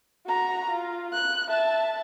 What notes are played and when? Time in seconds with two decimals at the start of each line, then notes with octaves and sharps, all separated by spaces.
0.26 F#4 A#5
0.70 F4
1.13 F#6
1.48 E5 A5